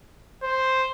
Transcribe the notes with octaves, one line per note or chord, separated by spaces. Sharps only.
C5